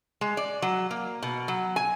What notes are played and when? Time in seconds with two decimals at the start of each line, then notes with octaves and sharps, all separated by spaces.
0.21 G#3
0.37 D5
0.62 F#3
0.91 A#3
1.23 B2
1.48 F#3
1.76 G#5